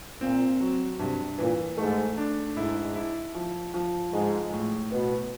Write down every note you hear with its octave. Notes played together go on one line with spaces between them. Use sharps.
A#2 C4
F#3
G2 C3
A#2 E3
G#2 A3
D4
G#2 E4
E4
F3
F3
G#2 G#3
A2
B2 B3